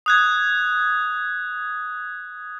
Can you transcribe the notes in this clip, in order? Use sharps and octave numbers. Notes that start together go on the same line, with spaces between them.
D#6 F#6 G#6